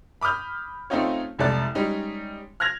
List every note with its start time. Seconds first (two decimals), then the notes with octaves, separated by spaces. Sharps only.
0.21 B5 D6 D#6 F6 G6
0.90 A3 C4 C#4 D#4 F4 C#5
1.39 F1 C2 G#3 A4 D5 F#6
1.75 G3 G#3 C#4 D#4
2.60 F6 F#6 G#6 A#6 F7